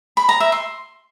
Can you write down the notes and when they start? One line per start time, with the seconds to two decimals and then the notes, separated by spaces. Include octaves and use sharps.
0.17 B5
0.29 A#5
0.40 E5
0.52 C6